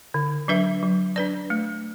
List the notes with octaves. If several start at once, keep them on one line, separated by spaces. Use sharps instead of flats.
D3
F#3 D4 B4 E5
F#3
D4 B4 D5
A3